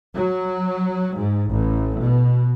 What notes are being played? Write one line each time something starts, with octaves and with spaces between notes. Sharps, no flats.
F#3
G#2
A1
B2